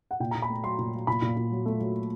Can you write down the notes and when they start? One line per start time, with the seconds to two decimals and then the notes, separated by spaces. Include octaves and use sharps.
0.11 F#5
0.20 A#2 G5
0.31 A#5
0.35 A#2
0.42 B5
0.49 A3
0.63 F#3 C6
0.79 A#2
0.93 F#3
1.07 A#2 B5
1.22 A#2
1.37 A#2
1.51 F#3
1.66 A3
1.80 F#3